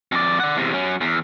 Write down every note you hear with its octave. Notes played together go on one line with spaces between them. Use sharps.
F2 D5
D5 F#5
E2 C3
F#3 C#4
E2